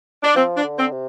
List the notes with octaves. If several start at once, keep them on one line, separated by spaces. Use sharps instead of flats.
D4
F3 C4
D4
D3
C4
C3